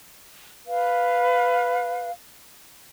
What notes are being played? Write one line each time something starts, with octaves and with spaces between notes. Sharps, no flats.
B4 F5